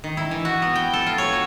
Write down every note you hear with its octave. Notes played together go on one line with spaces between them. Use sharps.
D#3
E4
E3
F#4
B3
G5
A4
F4
C#5
F#4